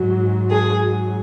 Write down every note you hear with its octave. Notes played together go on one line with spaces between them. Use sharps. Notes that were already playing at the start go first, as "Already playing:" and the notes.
Already playing: G#2 F#3
G#4